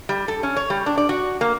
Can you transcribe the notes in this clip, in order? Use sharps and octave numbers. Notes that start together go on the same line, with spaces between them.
G3
A4
C#4
C#5
G3
D4
D5
F#4
A#3